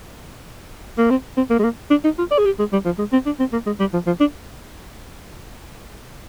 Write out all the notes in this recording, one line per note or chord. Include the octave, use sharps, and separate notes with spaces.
A#3
C4
C4
A#3
G#3
A#3
D4
D#4
F4
D5
G#4
G4
G#3
G3
F3
G#3
C4
D4
C4
A#3
G#3
G3
F3
F3
D4